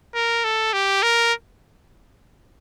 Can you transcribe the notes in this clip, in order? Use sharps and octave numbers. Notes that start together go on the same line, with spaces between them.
A#4
A4
G4
A#4